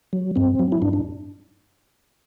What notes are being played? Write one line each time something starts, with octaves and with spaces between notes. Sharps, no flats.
F#3
G2 C4
F#3
E4
G2 D4
D4